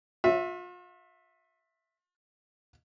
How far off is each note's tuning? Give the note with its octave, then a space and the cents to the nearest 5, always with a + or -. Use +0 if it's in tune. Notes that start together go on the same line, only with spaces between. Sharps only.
F4 +40 E5 +0